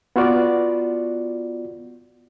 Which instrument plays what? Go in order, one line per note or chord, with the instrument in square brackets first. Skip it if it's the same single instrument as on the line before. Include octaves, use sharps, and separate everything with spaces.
[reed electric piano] B3 F4 F#4 D5